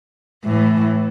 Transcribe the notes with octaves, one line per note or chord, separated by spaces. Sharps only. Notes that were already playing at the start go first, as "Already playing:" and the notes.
A2 E3